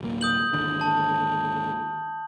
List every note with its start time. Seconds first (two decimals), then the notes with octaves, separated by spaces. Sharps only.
0.01 D1 B1 A#3
0.21 D#6 G6 F#7
0.53 G#1 D#2 D3
0.81 A5